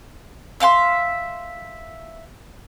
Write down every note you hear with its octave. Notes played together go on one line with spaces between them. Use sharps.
E5 F5 G5 C6